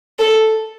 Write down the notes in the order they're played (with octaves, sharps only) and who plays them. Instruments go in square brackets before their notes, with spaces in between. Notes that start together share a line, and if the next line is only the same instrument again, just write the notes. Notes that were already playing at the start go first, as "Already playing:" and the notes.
[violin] A4